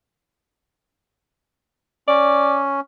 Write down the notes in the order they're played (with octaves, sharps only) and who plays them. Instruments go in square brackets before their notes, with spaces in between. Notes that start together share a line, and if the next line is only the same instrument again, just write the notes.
[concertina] C#4 [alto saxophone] D5